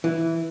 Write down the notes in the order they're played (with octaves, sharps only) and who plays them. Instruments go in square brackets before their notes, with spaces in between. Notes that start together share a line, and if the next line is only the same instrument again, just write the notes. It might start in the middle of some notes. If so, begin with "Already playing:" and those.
[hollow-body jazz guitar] E3